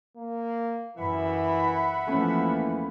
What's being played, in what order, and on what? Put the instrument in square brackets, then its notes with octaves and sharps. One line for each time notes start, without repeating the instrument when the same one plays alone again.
[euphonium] A#3
[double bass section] F#2 [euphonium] E3 [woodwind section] E5 F#5 B5
[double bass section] E2 F3 A#3 [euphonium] E3 [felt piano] A3 C#4